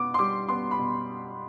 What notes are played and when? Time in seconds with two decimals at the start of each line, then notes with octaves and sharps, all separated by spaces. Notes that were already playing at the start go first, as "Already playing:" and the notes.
Already playing: B2 B3 D6
0.14 C6
0.19 G3 D6
0.48 B3 C6
0.71 B5
0.78 B2